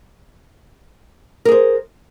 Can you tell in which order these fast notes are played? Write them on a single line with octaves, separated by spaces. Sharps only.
A#4 G#4 C5